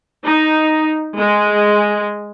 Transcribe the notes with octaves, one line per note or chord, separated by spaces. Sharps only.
D#4
G#3